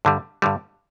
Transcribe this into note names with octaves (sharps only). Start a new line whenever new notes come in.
G2 D3 G3
G2 D3 G3